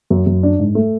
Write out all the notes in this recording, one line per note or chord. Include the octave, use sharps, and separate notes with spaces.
F#2
F#2
D4
G#2
A3